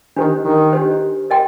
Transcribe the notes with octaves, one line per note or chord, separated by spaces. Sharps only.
D#3 D4 G4 C5
D#3
D4 G4 C5
A#4 D#5 G5 C6